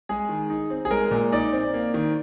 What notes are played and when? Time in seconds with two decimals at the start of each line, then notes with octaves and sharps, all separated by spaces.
0.09 G#3 G#4
0.29 D#3
0.50 D#4
0.70 C4
0.85 G#4
0.91 G#3 A#4
1.11 A#2
1.32 D#4 D5
1.53 C4
1.74 A#3
1.94 D#3